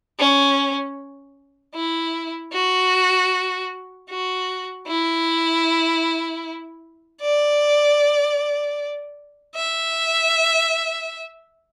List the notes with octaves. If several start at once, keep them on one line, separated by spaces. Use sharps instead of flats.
C#4
E4
F#4
F#4
E4
D5
E5